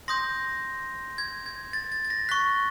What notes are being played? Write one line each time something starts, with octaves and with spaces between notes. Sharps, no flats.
C6 D#6 G6 A#6
G#6
G#6
A6
A6
A6
A#6
C#6 F#6 B6